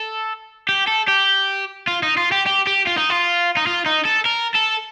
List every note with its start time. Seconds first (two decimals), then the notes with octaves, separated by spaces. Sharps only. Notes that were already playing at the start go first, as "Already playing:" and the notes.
Already playing: A4
0.69 G4
0.88 A4
1.08 G4
1.87 F4
2.03 D#4
2.17 F4
2.32 G4
2.46 G4
2.67 G4
2.87 F4
2.98 D#4
3.10 F4
3.57 D#4
3.67 F4
3.86 D#4
4.05 A4
4.26 A#4
4.55 A4